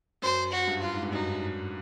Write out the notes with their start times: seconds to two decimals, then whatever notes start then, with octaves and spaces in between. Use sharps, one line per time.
0.22 F#2 C5
0.52 F#4
0.67 G2
0.82 F4
0.93 G#2
1.03 G2
1.12 F#2 D#4